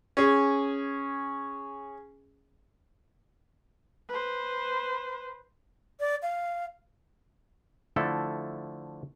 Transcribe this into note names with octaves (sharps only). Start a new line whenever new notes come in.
C#4 G#4
B4 C5
D5
F5
D3 F3 A3 E4 A4